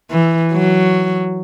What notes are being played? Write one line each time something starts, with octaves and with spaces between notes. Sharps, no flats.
E3
F#3